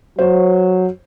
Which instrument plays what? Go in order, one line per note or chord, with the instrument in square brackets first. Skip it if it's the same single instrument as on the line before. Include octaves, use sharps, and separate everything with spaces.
[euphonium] F#3 [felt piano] C5 C#5